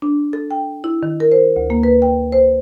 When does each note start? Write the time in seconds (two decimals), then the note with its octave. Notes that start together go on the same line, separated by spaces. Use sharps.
0.02 D4
0.33 A4
0.51 G5
0.84 E4
1.03 D#3
1.20 A#4
1.32 C5
1.56 D2
1.70 A#3
1.83 B4
2.02 G5
2.32 C5